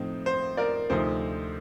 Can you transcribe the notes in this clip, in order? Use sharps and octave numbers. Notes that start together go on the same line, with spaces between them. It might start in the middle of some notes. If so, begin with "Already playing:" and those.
Already playing: A2 F3 C4 D#4
C5
A#4 D5
D2 C3 F3 C4 D#4 C5